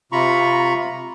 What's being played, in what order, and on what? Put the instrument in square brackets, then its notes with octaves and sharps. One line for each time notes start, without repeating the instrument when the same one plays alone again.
[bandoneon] C3 F4 A#5 B5 C#6